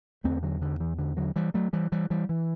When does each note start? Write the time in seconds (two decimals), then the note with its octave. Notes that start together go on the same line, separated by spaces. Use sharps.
0.24 E2 D3 A3 C4
0.43 D3 F#3
0.62 D3
0.80 E3
0.99 D3
1.17 D3 F#3
1.36 E3 G3
1.54 F#3 A3
1.73 E3 G3
1.92 E3 G3
2.10 E3 G3
2.29 E3